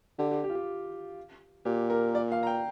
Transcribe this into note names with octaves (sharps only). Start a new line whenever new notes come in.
D3 G4
G4
G4
F4
G4
A#2 G4
A#4
D5
F5
A#5
G5